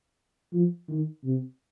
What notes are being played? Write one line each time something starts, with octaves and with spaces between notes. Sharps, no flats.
F3
D#3
C3